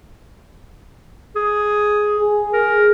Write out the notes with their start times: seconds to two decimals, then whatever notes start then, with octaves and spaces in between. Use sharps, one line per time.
1.36 G#4
2.19 G#4
2.53 A#4